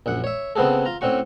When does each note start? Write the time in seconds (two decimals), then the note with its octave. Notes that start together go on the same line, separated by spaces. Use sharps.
0.06 A#1 F#2 F#5
0.24 C#5 E5
0.56 C#3 B3 C4 F#4 G#4 A4
0.86 F4 A#5
1.01 A2 C4 C#4 F#4 C#6